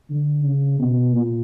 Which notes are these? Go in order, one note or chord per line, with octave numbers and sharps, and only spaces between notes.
D3
C#3
B2
A#2